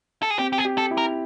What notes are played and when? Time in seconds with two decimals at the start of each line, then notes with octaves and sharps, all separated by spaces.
0.23 A4
0.30 G#4
0.38 C4 G4
0.53 G4
0.58 G#4
0.65 G4
0.78 A4
0.91 E4
0.97 A#4